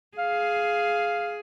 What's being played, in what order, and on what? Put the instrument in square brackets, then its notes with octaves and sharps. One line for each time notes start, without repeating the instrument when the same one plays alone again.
[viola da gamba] G#4 [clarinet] F5